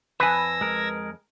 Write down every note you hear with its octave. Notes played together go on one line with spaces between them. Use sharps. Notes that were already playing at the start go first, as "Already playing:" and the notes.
F2 B4 G#5 E6 G#6 A#6
G#3 A#4